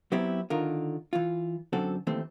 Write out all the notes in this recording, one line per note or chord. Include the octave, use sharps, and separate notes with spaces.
F#3 B3 C4 E4 G4
D3 D#3 F4 A#4
E3 F4
F#2 D3 C4 F#4 A4
D#2 E3 A3 C4